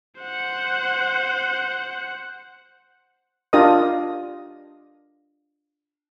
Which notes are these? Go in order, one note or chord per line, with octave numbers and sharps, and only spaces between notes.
C5 F#5
D4 F4 G4 A#4 D#5 D#6